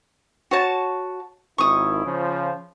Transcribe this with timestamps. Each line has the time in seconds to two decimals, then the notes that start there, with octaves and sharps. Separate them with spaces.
0.51 F#4 C#5 A5
1.58 G#1 D#3 E4 C#6 D#6
2.04 C#3 F3